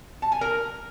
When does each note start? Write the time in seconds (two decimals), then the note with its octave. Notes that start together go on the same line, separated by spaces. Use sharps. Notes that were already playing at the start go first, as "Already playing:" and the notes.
0.22 A5
0.32 G#5
0.41 A#4